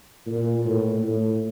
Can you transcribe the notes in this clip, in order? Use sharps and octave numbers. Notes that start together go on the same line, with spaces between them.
A#2
A2
A2